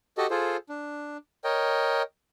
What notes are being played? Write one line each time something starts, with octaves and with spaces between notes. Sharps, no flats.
F#4 G4 A4 D#5
F4 G#4 A4 C5
D4
A#4 C#5 D#5 G5